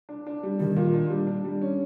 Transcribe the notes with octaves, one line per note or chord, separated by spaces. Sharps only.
D4
D4
G3
D#3 G3
A#2
D4
G3
D4
G3
C#4